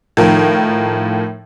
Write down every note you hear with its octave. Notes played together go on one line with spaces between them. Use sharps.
A2 D#3 F3 A#4